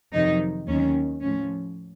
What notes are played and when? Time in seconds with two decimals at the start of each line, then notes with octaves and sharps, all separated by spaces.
0.13 F2 C3 D#3 F#3 D#4
0.67 D#2 D#3 F#3 C#4
1.22 A2 F3 C#4